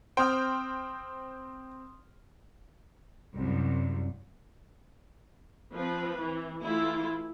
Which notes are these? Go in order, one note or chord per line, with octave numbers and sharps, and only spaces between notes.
C4 C5 G5 C6 D#6 F6
C2 F#2
F3 C4 B4
E3
E3 A3 E4 F4